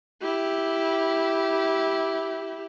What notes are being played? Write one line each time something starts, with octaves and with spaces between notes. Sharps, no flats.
E4 G4